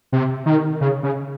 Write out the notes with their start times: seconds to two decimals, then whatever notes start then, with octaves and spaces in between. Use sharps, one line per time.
0.12 C3
0.46 D#3
0.81 C#3
1.03 C#3